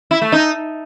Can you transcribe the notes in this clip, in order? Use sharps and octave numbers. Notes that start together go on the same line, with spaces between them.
E4
A3
D#4